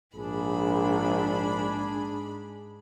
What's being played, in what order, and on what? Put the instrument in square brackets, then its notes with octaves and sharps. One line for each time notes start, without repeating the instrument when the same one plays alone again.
[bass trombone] A#1 [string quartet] G#2 B5 [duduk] D4 [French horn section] G#4